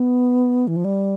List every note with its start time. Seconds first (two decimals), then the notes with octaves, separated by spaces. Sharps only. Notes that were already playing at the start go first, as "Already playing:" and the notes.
Already playing: B3
0.67 E3
0.76 F3
0.84 G3